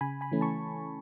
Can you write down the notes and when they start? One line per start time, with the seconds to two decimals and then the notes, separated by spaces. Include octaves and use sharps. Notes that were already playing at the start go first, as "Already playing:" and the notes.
0.01 C#3 G#5 B5
0.21 G#5 B5
0.32 E3 A3 C#4
0.41 A5 C#6